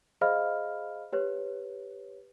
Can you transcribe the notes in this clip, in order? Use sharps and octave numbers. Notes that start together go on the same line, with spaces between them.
G#4 C5 D#5 F5 B5 F6
G4 B4 C#5